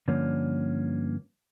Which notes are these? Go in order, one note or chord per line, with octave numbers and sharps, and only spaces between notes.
G2 D3 F3 A#3 C#4